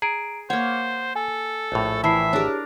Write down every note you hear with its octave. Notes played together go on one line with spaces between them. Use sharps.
G#4 A#5 D7
A#3 C5 C#5 F#5
A4 G#5
A#1 A2
E3 E5 A5 B5 C7
D4 G4 G#4 A#4 C#5